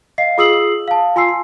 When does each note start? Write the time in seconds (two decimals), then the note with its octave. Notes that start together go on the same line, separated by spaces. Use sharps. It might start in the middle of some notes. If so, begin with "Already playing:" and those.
0.18 D#5 F5 C7
0.38 F4 G#4 D#6 E6 C7 F#7
0.88 F5 A5
1.16 F4 G#5 C6 E6 C7
1.29 C6